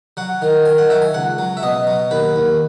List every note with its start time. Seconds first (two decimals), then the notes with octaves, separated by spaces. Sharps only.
0.17 F#3 F#5
0.42 D#3
0.65 D#3 G#5
0.78 F#5
0.90 F#3 E5
1.02 G#5
1.14 C#2 F#5
1.38 F#3
1.57 E5
1.63 B2 D#5
1.87 F#3
2.11 D#2 B4
2.36 D#2